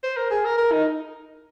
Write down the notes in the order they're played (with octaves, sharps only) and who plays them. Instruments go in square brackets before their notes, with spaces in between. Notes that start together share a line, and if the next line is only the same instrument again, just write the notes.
[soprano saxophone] C5
A#4
G#4
A#4
A#4
D#4